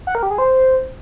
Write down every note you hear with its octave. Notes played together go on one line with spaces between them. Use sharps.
F#5
A#4
G4
G#4
C5